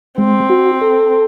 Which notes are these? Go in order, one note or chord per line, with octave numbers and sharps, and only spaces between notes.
G#3 C4
F#4
A4